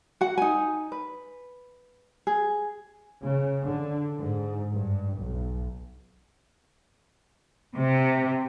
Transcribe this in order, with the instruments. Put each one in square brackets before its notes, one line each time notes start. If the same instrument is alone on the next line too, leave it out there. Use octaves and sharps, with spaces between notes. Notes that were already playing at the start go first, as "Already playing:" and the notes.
[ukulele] F#4 F#5
D#4 G#5
B4
G#4
[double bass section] C#3
D3
G#2
G2
B1
[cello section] C3